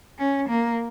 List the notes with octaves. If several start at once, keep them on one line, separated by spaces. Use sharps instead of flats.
C#4
A#3